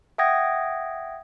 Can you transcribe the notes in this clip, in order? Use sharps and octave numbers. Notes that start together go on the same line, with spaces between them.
E5 F#5 G5 D#6 G#6 A#6